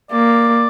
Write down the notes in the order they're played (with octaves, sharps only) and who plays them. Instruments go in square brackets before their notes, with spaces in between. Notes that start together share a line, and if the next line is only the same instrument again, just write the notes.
[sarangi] A#3 [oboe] D5